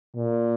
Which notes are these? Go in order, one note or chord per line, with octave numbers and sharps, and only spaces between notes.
A#2